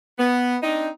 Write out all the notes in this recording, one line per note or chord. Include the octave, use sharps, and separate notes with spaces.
B3
C4 D4 D#4